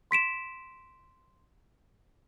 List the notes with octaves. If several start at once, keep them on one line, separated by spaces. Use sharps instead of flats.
C6 B6 D7 E7